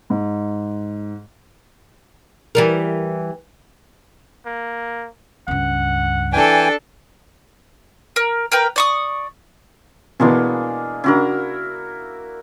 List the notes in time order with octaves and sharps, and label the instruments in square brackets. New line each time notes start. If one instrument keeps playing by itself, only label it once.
[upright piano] G#2
[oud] E3 G3 A#4
[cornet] A#3
[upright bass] C#2 G2 [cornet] F#5
[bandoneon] E3 G5 G#5 [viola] D4 A4
[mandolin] A#4
A#4 B4 G5
D5 C#6 D#6
[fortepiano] B2 E3 B3 [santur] G#3 A#3 D4
[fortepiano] C#3 D4 [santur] E4 F#4 A#4